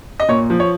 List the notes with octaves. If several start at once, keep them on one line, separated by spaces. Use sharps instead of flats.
D#5
A#2 C#5
F3
C#5